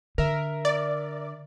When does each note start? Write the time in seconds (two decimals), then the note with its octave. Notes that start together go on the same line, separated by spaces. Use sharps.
0.18 D3 A#4 E5
0.65 D5